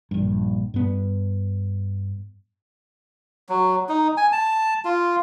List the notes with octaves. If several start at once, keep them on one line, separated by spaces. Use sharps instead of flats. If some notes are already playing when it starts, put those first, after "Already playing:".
A#1 G2
G2 B3
F#3
D#4
G#5
A5
F4